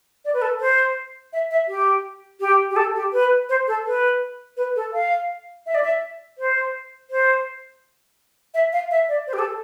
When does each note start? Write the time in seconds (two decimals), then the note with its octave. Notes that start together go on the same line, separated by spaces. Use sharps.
0.25 D5
0.33 B4
0.42 A4
0.60 C5
1.33 E5
1.51 E5
1.68 G4
2.40 G4
2.71 G4
2.76 A4
2.95 G4
3.13 B4
3.49 C5
3.67 A4
3.86 B4
4.57 B4
4.76 A4
4.93 F5
5.66 E5
5.74 D5
5.84 E5
6.38 C5
7.10 C5
8.54 E5
8.73 F5
8.91 E5
9.08 D5
9.27 C5
9.33 G4
9.39 A4